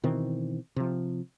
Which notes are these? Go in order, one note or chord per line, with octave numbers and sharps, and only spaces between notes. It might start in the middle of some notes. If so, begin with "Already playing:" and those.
B2 D#3 E3 C4
C3 F3